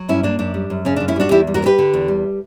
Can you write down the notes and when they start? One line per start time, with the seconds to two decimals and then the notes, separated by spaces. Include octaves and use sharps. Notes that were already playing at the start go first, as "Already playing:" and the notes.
Already playing: F#3
0.08 G2 C#4 E4
0.23 A#3 D4
0.39 F#2 D4
0.54 G3
0.70 F#2
0.85 C#3 C#4
0.96 D4
1.00 F#2
1.08 C#4 E4
1.16 G3 D4 F#4
1.31 E2 E4 G4
1.47 G3
1.54 F#4 A#4
1.62 B3
1.66 G4 B4
1.78 D3
1.94 E2
2.08 G3